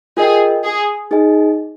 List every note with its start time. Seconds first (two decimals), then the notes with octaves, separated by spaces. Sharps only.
0.17 F4 G#4 A#4 D#5 G5
0.64 G#4
1.11 D#4 G#4 D#5 G#5